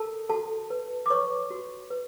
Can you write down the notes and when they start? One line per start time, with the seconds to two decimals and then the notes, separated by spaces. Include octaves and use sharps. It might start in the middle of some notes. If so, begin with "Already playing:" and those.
Already playing: A4 A#4 A5
0.29 F#4 A4 A5
0.70 B4
1.06 D6
1.10 B4 C#5 C#6
1.50 F#4
1.90 B4